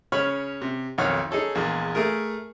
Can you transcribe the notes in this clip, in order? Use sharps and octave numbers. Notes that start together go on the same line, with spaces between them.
C#3 C#4 C#5 B5 F6
C3
B1 F2 D#3 C#5 F#5 F6
D#4 G#4 A4 C#5
A#1 E2 G#3
A3 G#4 A#4